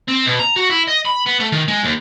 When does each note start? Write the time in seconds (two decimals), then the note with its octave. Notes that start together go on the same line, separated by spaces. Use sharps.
0.08 C4
0.26 B2
0.39 A#5
0.56 F#4
0.70 E4
0.87 D#5
1.05 B5
1.26 B3
1.40 A3
1.52 D#3
1.68 G#3
1.83 D#2